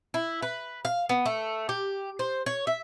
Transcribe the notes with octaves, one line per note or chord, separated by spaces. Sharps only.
E4
B4
F5
B3
A3
G4
C5
C#5
E5